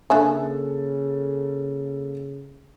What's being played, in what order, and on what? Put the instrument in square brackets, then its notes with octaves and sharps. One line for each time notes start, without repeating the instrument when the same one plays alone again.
[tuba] C#3 [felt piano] A#3 A4 [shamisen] D4 E5 G#5